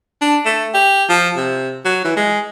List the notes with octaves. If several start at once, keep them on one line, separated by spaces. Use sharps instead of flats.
D4
A3
G4
F3
C3
F#3
E3
G#3